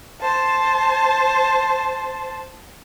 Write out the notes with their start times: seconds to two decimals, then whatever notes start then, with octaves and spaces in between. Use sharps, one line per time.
0.21 C5 A5